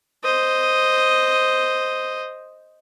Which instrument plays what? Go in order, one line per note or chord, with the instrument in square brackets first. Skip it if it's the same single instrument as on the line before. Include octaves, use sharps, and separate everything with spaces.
[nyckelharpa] C5 D#5